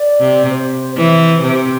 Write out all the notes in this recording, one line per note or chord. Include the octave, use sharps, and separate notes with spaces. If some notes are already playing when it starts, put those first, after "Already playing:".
Already playing: D5
C3
C5
E3 C5
C3 C5